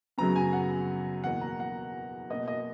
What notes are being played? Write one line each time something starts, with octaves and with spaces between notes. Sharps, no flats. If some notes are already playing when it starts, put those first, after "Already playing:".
F#2 C#3 F#3 B3 A#5
G#5
F#5
E2 B2 A#3 F#5
A#5
F#5
B2 A#3 D#5
D#5